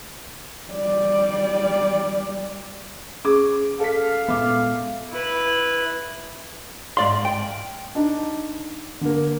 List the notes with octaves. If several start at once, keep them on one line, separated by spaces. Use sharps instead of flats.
G3 D5
C#4 G#4 D6
A4 F5 B6
A#2 G#3 B3 E5 D6
E4 B4
G#2 D5 F5 C6
G5
D4 D#4
D3 A#3